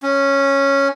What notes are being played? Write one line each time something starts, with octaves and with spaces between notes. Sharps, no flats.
C#4